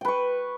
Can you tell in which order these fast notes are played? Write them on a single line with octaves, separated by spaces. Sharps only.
G5 B4 C#6